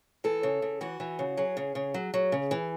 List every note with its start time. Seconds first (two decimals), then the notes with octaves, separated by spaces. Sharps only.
0.24 E3 A4
0.43 C#3
0.62 C#3
0.81 E3 F#4
1.00 E3
1.19 C#3
1.37 F#3 G#4
1.57 C#3
1.75 C#3
1.94 F#3
2.14 F#3
2.32 C#3
2.51 E3